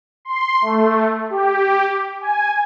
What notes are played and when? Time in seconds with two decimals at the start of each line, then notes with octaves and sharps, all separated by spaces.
0.25 C6
0.61 A3
1.30 G4
2.21 G#5